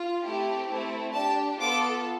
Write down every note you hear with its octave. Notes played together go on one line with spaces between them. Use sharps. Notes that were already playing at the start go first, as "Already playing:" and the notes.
Already playing: F4
A3 C4 E4 G4
A3 C4 E4
D4 G4 A5
B3 F4 A4 D6